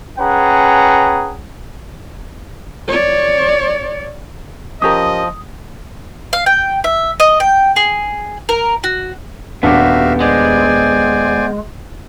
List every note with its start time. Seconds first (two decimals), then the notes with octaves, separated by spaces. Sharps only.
0.19 C#4 G#4 B4 F#5 G5 A#5
2.88 C#5 D5
4.82 F3 C#4 G4 A#4 D#5 D#6
6.33 F5
6.46 G5
6.84 E5
7.20 D#5
7.40 G5
7.76 G#4
8.49 A#4
8.84 F#4
9.63 D#1 B3 D4 F#4 G4 E5 F5
10.20 G#3 C5 D5 G#5